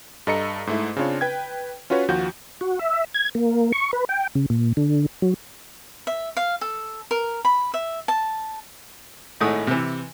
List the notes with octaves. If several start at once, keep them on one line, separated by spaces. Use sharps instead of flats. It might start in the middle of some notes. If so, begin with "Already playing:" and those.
G2 A4 D#5 A#5 C#7
G#2 A3 E4
C#3 C4 D4 F4 C#5
B4 G5 G#6
C#4 F4 F#4 B4 C#5
D#2 F3 F#4 G6
F#4
E5
G#6
A#3
C#6
B4
G5
C#3
A#2
D3
F#3
E5
F5
A4
A#4
B5
E5
A5
G#1 A2 G#3 A3 F#5 D#6
C3 E3